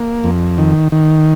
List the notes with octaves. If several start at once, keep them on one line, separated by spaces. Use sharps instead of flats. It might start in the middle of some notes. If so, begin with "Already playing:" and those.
Already playing: A#3
F2
D#3
D#3